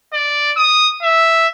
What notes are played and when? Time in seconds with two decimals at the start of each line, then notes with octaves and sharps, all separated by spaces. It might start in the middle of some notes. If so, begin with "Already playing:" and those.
0.13 D5
0.57 D#6
1.02 E5